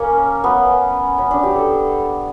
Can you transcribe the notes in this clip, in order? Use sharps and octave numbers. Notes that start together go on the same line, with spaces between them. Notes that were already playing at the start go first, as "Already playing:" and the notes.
Already playing: A#3 C#4
B3
C#4
D4
G4
A4